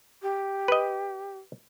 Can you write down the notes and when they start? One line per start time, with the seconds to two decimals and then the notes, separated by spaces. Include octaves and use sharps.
0.22 G4
0.68 B4 D#5